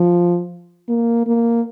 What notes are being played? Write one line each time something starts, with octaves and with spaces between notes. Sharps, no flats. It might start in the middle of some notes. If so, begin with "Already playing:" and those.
Already playing: F3
A#3
A#3